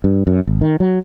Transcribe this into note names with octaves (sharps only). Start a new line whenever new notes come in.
G2
F#2
G#1
D#3
F#3